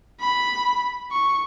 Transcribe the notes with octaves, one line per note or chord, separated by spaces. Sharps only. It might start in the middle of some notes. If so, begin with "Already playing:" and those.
B5
C#6